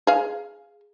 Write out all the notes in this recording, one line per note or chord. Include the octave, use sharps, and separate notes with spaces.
G#4 F5